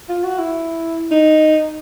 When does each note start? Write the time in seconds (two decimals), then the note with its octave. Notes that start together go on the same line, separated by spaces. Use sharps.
0.09 F4
0.24 F#4
0.39 E4
1.11 D#4